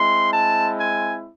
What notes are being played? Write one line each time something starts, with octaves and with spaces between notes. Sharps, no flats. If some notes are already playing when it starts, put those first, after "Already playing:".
Already playing: G#3 C4 E4 C6
A5
G#5